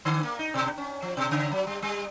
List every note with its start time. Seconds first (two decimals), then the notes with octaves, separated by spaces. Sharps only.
0.05 D3
0.23 A#3
0.39 D#4
0.54 B2
0.78 C#4
1.02 F3
1.17 B2
1.31 C#3
1.51 F#3
1.67 G3
1.82 G3